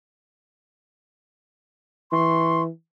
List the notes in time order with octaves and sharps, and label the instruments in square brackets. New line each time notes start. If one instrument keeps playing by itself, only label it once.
[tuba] E3 [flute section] C6 C#6